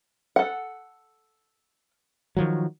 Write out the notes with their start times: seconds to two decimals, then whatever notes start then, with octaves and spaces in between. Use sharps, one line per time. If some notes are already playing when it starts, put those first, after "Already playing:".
0.36 A4 F#5
2.37 D#3 F3 F#3